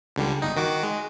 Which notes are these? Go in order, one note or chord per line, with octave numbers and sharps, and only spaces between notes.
C#2 D3 G3
G1 D#4
D#3 F#4 D6
G#3